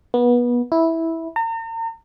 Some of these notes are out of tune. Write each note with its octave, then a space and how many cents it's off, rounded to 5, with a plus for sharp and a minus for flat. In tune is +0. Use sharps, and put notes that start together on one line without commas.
B3 -25
E4 -10
A#5 -40